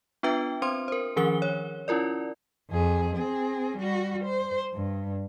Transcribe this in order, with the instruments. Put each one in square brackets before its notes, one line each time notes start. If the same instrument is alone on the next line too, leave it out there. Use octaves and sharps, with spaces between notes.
[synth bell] B3 D4 F4 B4 E5 G5
C4 C5 C6
A#4 C5
D#3 F3 C#4 G#4 A#4 G7
C#5
C#4 E4 F4 A#4 D5
[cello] F2 G#4
C4 G#4
G3 F#4
C5
G2